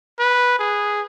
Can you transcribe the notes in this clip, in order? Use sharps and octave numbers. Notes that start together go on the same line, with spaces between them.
B4
G#4